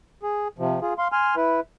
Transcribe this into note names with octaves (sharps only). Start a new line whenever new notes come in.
G#4
C3 F3
F4 G#4
F5 C6
G#5 C6 F6
E4 B4